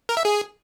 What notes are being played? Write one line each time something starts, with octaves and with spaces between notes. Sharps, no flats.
A#4
E5
G#4